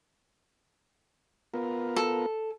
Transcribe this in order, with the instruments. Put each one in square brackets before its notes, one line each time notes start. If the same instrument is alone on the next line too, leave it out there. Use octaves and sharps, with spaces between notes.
[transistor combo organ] B3 F4 A#4
[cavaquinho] A4